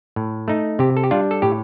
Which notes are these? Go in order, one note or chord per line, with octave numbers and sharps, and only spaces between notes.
A2
A3 D#4
C3 G4
A4
G4
G3 D4 F4
A4
A2 G4